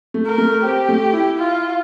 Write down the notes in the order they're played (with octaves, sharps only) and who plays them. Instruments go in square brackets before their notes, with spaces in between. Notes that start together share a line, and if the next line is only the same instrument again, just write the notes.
[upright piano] A3
[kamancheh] A#4
[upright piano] A3
[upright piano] C4 [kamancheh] G4
[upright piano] A3
E4
[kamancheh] F4